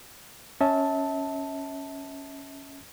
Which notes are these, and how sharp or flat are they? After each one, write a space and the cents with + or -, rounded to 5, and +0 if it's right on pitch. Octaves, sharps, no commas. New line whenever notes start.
C#4 +0 E5 -35 A5 +0